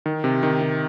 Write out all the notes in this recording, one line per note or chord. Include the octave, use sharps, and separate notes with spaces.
D#3
C3
D#3
C3